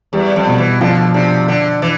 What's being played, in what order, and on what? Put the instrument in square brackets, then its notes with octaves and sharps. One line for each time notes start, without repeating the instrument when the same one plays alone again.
[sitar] E2 [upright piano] G3
[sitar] F2
[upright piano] B2
[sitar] E3
[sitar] D3 [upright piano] F3
[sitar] C3 [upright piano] D4
[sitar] D3 [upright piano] D4
[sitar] E3 [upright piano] D5